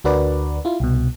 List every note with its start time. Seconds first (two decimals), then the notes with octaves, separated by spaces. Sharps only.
0.04 D2 D4 F#4 A#4 B4 D5
0.65 E4 F4
0.80 C2 B2